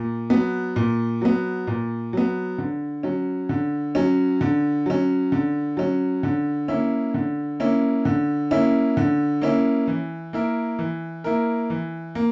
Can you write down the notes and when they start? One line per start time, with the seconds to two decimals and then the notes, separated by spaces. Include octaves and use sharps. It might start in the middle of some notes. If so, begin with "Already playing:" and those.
Already playing: A#2
0.30 F#3 B3
0.76 A#2
1.22 F#3 B3
1.67 A#2
2.13 F#3 B3
2.58 D3
3.03 F#3 C#4
3.49 D3
3.95 F#3 C#4
4.41 D3
4.86 F#3 C#4
5.32 D3
5.77 F#3 C#4
6.23 D3
6.68 A#3 C#4 E4
7.14 D3
7.60 A#3 C#4 E4
8.05 D3
8.51 A#3 C#4 E4
8.97 D3
9.42 A#3 C#4 E4
9.87 E3
10.33 A#3 E4 A#4
10.79 E3
11.24 A#3 E4 A#4
11.70 E3
12.15 A#3